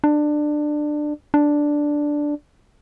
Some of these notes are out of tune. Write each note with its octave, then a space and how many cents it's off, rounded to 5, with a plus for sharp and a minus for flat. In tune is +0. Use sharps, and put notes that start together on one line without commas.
D4 +20
D4 +0